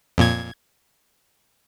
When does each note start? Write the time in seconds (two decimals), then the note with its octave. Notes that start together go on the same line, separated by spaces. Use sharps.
0.18 F2 A#2 G#6